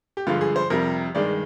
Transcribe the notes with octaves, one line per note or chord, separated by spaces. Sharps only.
G4
G2 D3 F3 G#3 F4
G#4
C5
F2 C3 G3 A#4
G2 D#3 G#3 D5